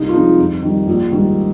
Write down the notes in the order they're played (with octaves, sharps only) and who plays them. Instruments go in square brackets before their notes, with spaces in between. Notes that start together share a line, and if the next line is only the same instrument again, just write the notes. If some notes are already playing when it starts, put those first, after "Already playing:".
Already playing: [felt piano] C2 D#4
F4
C3 F3 G#3 D#4
F2
D#3 G3
A#1
G#2 D#3 G3